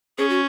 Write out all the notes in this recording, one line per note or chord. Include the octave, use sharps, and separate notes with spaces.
C#4 G#4
F#4